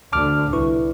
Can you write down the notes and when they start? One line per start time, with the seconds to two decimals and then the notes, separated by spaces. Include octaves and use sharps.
0.12 D2 D3 A5 D6 F6
0.53 C2 E4 B4 C#6